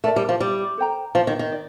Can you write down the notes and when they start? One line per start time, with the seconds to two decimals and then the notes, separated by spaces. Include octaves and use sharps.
0.04 A3 A#4 D5 A5
0.16 G3
0.29 F3
0.40 G3
0.78 A4 C5 G5 A#5
1.15 F3
1.27 D#3
1.39 D#3
1.52 D5